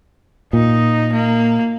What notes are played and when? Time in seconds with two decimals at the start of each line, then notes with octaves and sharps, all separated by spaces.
0.53 A#2 D#4
1.13 A#3